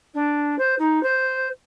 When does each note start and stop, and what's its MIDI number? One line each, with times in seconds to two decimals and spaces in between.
0.14 0.55 62
0.58 0.74 72
0.78 1.01 63
1.03 1.48 72